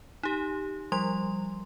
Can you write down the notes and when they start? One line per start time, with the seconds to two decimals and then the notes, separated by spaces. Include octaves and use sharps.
0.23 D#4 G4
0.92 F3 G3 C6